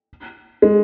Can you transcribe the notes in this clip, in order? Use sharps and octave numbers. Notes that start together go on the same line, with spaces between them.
G#3